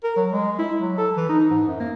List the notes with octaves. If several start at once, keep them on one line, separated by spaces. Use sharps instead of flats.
A#4
F#3
G#3
E4
F#3
A4
E3
D#4
G#2
F#2
A#3